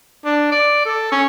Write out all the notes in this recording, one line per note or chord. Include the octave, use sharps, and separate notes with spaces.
D4
D5
A4
C#4